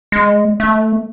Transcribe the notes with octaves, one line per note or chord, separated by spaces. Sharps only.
G#3
A3